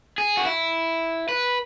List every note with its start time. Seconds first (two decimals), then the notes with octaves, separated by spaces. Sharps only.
0.18 G#4
0.37 F#4
0.45 E4
1.29 B4